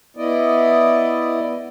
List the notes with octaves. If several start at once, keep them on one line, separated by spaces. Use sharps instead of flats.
B3 E4 D5 D#5